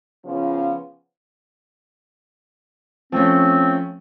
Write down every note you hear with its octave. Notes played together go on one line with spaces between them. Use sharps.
C#3 F3 B3 C#4
F3 A3 C4 C#4